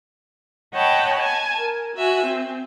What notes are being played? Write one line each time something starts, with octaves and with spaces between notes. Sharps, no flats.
C#5 D#5 F#5 G5 A5 B5
G#5 A5
A#4
F#4 E5 G#5
C4